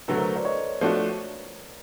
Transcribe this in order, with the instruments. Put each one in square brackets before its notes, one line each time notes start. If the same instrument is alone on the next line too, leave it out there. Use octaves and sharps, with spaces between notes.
[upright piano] D3 F#3 A3 [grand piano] A4 B4
[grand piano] A#4 C5
C5 D5
C#5 D#5
[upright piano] F3 A3 D4 F#4